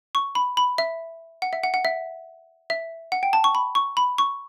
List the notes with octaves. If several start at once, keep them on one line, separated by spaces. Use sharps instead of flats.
C#6
B5
B5
E5
F#5
E5
F#5
F#5
E5
E5
F#5
G5
A5
C#6
B5
C#6
B5
C#6